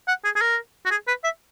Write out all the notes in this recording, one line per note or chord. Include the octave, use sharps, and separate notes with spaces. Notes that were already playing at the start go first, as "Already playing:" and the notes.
F#5
G#4
G#4
A#4
F#4
G#4
B4
E5